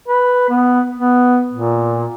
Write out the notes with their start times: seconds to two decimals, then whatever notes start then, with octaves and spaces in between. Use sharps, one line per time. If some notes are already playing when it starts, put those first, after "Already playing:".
0.08 B4
0.49 B3
0.97 B3
1.53 A#2